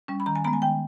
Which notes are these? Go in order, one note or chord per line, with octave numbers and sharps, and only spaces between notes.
G3 C#4
B5
D#3 A#5
G#5
G#3 B3 A#5
G#5
D#3 G5